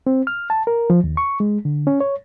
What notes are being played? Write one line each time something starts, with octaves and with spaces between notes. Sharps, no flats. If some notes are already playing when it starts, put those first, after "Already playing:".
C4
F6
A5
A#4
F3
D#2
C#6
G#3
D3
C#4
C#5